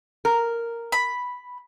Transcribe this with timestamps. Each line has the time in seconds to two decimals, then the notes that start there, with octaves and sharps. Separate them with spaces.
0.25 A#4
0.92 B5